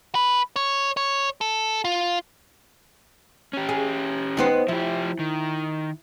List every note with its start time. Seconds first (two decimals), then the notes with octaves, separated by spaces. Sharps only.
0.15 B4
0.56 C#5
0.97 C#5
1.41 A4
1.85 F4
3.53 C#4 G4
3.69 G#4
4.37 D#3 B3 C5
4.68 F3 E4 G4
5.19 D#3